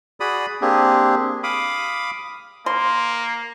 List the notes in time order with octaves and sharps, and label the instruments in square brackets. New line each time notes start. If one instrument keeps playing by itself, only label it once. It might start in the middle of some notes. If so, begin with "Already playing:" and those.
[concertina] F#4 G#4 D5 B5 D#6
A#3 C4 D4 G4 G#4
F5 B5 D6 D#6
[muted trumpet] A#3 [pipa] C6